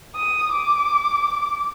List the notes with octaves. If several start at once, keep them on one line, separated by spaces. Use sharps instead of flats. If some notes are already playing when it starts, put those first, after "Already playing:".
D#6
D6